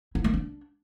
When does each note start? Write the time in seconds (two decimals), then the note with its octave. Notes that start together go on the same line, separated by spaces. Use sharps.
0.15 E4
0.24 A#3
0.34 D4